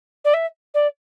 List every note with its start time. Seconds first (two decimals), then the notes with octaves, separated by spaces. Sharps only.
0.25 D5
0.34 E5
0.74 D5